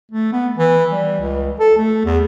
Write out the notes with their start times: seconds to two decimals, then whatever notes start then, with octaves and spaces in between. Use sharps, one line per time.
0.12 A3
0.32 B3
0.57 E3
0.91 G3
1.20 C#2
1.60 A4
1.77 A3
2.05 E2